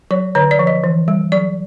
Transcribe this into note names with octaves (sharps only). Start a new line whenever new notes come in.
F#3 C#5
D3 C#5
D5
F3
D#5
E3
G3
F#3 D5